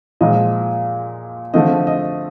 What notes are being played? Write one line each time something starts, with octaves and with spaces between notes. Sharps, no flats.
A#2 F3 G#3 D#5
D3 F3 A3 C4 D#5
D#5